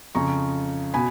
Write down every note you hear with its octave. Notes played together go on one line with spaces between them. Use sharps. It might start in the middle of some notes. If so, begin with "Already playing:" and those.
F2 C#3 A#5 C#6
B2 G#5 B5